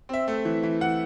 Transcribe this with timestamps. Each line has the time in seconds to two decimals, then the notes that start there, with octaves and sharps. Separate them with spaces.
0.09 C4 E5
0.28 A3
0.45 E3
0.63 E3
0.81 E3 F#5